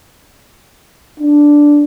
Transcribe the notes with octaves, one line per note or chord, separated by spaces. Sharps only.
D4